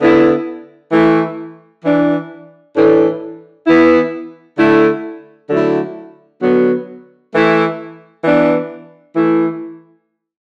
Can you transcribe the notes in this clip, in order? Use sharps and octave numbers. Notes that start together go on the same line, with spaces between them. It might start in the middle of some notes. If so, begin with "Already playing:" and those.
D3 B3 E4
E3 A3 E4
E3 D4
A2 E3 A3 D4
E3 B3 E4
D3 A3 E4
D3 F#3 A3 E4
D3 F#3 B3
E3 A3 E4
E3 B3 D4
E3 A3 E4